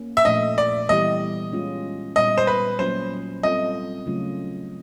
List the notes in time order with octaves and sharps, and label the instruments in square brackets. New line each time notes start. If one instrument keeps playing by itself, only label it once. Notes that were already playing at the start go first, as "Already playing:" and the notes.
Already playing: [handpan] A#3 C#4
[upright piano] E5
[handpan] A#2 F3 A3 D4 [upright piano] D#5
[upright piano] D5
[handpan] E3 G3 B3 E4 G4 [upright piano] D#5
[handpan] G#3 C#4 F4
[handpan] A#2 G3 B3 [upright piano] D#5
[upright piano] C5
B4
[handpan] F#3 A#3 C#4 F4 [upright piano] C5
[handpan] G3 C4 F4 A4 [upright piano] D#5
[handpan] C#3 F#3 A3 C#4 F4